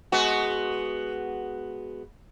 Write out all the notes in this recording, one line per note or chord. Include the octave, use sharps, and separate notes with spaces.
G#3 B3 F#4